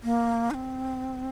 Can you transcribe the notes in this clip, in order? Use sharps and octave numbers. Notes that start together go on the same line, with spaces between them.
A#3
D#4
C4